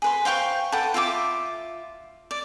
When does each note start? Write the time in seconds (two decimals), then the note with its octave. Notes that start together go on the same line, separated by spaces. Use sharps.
0.02 G#4 B4 C6
0.25 C5 F5 G5 C#6
0.72 A4 B4 F#5 G5
0.94 F4 E5 G#5 D6
2.31 D5